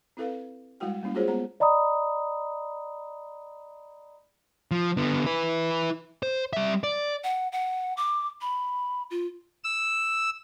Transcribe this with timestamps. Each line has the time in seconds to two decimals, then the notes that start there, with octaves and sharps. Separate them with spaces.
0.17 C4 E4 A4 B4 F5
0.80 G3 G#3 E4 F#4 G5
1.03 G3 A#3 C#4 E4
1.15 G#3 F4 F#4 G#4 C5 C#5
1.28 G#3 B3 A#5
1.60 D5 D#5 A#5 B5 D#6
4.71 F3
4.97 D3 B3
5.26 E4 B4
6.23 C5
6.53 G3 E5
6.84 D5
7.24 F#5
7.52 F#5
7.97 D6
8.41 B5
9.11 F4
9.64 E6